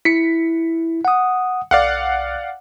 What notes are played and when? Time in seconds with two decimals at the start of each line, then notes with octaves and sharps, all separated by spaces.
0.05 E4 B6 C#7
1.05 F#5 D#6
1.71 B1 D5 F5 F#5